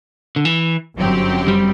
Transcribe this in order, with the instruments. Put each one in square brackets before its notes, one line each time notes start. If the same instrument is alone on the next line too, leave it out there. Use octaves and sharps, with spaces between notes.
[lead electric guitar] D3
E3
[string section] G1 F#2 F#3 C4 G4
[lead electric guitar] G3